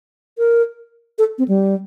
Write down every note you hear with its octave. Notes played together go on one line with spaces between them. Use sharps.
A#4
A4
C4
G3